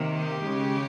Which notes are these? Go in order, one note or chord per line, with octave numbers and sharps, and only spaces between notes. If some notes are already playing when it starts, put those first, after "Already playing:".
Already playing: C3 D#3 A#3
G4
C#3 G#3